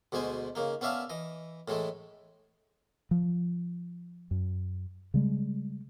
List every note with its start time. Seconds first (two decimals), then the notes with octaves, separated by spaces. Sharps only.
0.12 D2 B2 G#3 C5 G#5
0.55 C#3 A#3 D#4
0.81 B3 C#4 D5 E5 F5 A5
1.10 E3 D#5
1.68 A2 E3 G#3 A3
3.11 F3
4.31 F#2
5.14 C#3 G3 G#3